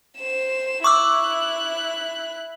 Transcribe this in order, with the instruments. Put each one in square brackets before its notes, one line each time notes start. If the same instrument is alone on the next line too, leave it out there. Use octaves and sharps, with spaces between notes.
[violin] C5 E7
[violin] E4 F#6 [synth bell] C#6 D6 E6